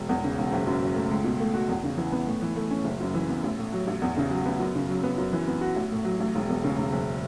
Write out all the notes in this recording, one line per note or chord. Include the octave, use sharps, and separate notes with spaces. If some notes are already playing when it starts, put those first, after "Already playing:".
Already playing: E1
E2
C#3
E1
F#1
F#2
F#3
A3
C#2
B2
A3
F#4
E2
C#3
E3
B3
A2
E3
A3
C#4
F#1
F#2
E3
B3
A1
A2
F#3
A1
E2
C#3
F#3
B3
F#2
C#3
F#3
B3
F#2
E3
B3
F#4
A1
A2
F#3
A1
E1
E2
C#3
E1
F#1